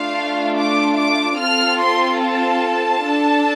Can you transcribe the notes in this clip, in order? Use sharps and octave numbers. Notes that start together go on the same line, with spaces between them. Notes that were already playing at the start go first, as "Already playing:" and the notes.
Already playing: A3 D4 F4 F5
D6
D6
C4 F4 A4 F6
C6
A5
D4 A4